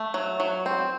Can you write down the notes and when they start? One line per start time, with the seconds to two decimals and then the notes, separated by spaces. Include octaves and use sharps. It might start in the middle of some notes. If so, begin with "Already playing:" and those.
Already playing: A3
0.14 F#3
0.40 F#3
0.66 C4